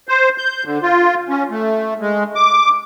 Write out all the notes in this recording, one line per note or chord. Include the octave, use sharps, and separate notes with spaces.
C5
G6
D3
F4
C#4
A3
G#3
D6